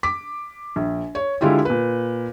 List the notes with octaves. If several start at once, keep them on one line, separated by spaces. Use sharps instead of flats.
D6 B6
A#1
C#5
D3 G#3 E4 F4 G4
A#2 B4